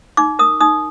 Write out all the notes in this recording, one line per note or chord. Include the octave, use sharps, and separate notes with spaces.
D#4 D6
A#4 D#6
D#4 D#6